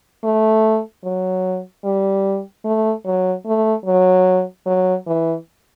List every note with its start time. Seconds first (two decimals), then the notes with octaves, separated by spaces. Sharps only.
0.24 A3
1.04 F#3
1.84 G3
2.65 A3
3.05 F#3
3.46 A3
3.86 F#3
4.66 F#3
5.07 E3